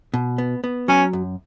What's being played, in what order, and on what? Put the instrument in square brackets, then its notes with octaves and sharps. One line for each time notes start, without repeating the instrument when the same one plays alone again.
[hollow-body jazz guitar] B2
B3
B3
[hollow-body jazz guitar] F#3 [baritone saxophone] C#4
[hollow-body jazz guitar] F#2